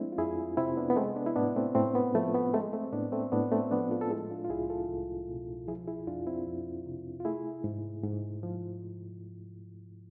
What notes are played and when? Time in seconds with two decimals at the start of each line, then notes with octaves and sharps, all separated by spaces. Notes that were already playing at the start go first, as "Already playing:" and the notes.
Already playing: F3 G#3 A3 C4 D4 E4
0.12 F4
0.18 F2 E4 G#4
0.57 C3 C4 E4
0.77 B3 D4
0.90 B3
0.96 G#3 A3 C4
1.16 B3 D4
1.26 E4
1.36 A2 B3 D4
1.56 A3 C4
1.75 A2 A3 C4
1.95 B3
2.15 F3 A3
2.34 B3
2.53 G#3 A3 C4
2.73 A3 C4
2.92 A2 B3 D4
3.12 A3 C4
3.32 A2 B3 D4
3.52 A3 C4
3.71 F3 B3 D4
3.91 F4 A4
4.01 A4
4.10 G#3 E4 G#4
4.30 D4 F4
4.45 F4
4.50 C2 E4 G#4
4.70 F4 A4
4.89 C2
5.29 B2
5.68 F3 E4 G#4
5.87 E4 G#4
6.07 F2 D4 F4
6.27 C4 E4
6.47 F2
6.86 C3
7.20 F4
7.25 A3 E4 G#4
7.64 G#2
8.03 G#2
8.43 F3